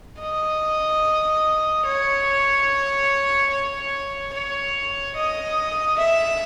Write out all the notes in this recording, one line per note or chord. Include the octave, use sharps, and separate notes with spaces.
D#5
C#5
C#5
C#5
D#5
E5